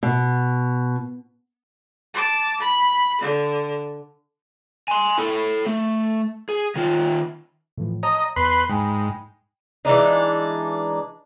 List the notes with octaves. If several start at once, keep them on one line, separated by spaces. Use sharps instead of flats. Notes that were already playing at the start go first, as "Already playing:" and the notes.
B2
A5 D6
B5
D3
G#5 C6
E4 A4
A3
G#4
D#3 F4
A2 E3 F3
C#5 D#5 A5 A#5
E2 B4 B5 C6
G#2 G5 G#5 B5
E3 G#3 D4 D#4